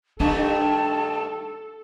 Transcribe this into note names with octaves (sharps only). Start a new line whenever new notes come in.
G2 D#3 A3 D4 A4 A5